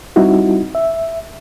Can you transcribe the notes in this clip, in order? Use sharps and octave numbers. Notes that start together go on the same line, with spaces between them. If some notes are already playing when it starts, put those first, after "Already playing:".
G3 C4 D#4 E4 F#4
E5